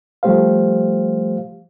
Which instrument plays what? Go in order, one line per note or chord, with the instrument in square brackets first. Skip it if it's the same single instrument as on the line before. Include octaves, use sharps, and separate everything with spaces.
[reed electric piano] F3 G3 A3 G4 C5 F5